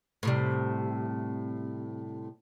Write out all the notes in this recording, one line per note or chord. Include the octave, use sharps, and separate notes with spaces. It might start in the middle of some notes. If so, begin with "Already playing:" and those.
A2 C3 G3